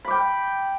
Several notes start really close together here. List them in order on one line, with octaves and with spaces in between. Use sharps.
B5 D6 G5